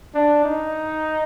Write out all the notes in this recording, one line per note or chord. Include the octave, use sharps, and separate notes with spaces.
D4
D#4